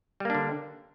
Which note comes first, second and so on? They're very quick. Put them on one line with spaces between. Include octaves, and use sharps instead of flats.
G3 A#3 D4 D3